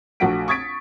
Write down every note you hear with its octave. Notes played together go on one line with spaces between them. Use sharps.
A#1 A3 F#4 F#5 B6 D7
C#6 D#6 G#6 A6 B6 D7